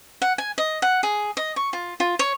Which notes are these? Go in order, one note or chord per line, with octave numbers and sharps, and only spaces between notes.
F#5
G#5
D#5
F#5
G#4
D#5
C#6
F4
F4
C#5